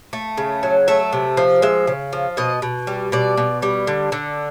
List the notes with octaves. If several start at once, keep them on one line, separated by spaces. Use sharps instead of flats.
A3
C#3
F#3
A3 E5
C3
F3
G#3 E5
C#3
F3
B2 D#5
B2
G3
B2 D5
B2
G3
D3
D3